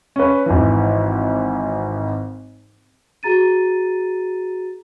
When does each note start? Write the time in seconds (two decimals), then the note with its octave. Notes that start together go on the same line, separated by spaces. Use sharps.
0.16 C#4 B4
0.46 G#1 E3
3.23 F#4 G#4 A#5 A6 D#7